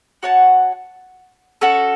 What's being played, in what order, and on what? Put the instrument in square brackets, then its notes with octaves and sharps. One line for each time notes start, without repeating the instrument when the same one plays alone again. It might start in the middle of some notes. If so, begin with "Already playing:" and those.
[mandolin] F#4 C#5 F#5 A5
C#4 F#4 A4